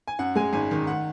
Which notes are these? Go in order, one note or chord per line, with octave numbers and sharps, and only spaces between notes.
G#5
F#2 F#5
G#3 G#5
G#1 G#5
D#3
F#5